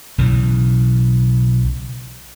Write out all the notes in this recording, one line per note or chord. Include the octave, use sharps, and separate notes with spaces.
B1 C#3 E3